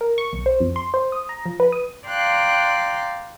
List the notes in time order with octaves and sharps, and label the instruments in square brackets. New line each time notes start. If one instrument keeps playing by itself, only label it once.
[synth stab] A#4
C#6
B1
C5
F2
C6
C5
D#6
A#5
F3
B4
D#6
[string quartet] D5 F5 G5 A#5 C6 F#6